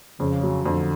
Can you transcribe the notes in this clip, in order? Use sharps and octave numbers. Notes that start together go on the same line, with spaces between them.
F2 C#3
F#3
F2 D3